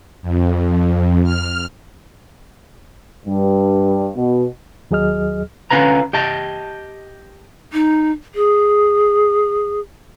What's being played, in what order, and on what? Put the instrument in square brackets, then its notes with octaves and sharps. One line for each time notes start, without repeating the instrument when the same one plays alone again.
[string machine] F2
F6
[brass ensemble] G2
B2
[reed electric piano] D#2 F#3 G#4 D#5 F6
[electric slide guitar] D3 C#4 F4 B4 A#5
G4 D#5 A5
[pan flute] D#4
G#4